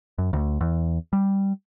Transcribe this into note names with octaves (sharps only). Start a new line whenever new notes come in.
F#2
D2
E2
G3